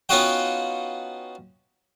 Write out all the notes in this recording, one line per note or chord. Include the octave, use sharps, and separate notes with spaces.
B3 C#4 D#4 F4 F#4 G5